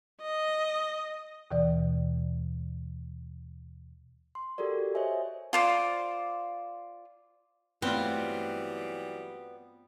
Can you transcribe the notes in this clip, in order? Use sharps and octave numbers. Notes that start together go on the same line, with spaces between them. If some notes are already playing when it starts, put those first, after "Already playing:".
D#5
D#2 B2 E3 D5
C6
F#4 G4 A4 A#4 D5
C5 C#5 D#5 E5 G#5
F4 C5 D5
G2 E3 F#3 G3 A3 B3 C4 F4